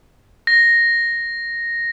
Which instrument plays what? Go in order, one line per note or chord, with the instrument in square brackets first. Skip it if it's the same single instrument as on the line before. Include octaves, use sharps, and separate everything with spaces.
[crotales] A#6